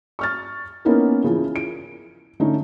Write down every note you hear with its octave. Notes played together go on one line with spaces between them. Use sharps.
C#6 F6 A6
A#3 B3 C#4 D#4 E4 A#4
C#3 E3 F3
D7
D3 A3 C#4 D#4